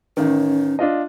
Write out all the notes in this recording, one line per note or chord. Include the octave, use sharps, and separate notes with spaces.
A1 D#3 C#4
D4 F4 D#5